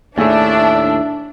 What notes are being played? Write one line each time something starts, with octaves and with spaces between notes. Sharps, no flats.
D#2 A2 A3 D4 G#4 E5